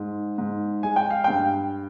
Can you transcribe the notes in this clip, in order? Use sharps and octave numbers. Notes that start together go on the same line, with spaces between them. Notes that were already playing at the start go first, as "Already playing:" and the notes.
Already playing: G#2
G#2
G#3 G#5
G5
F5
G2 G5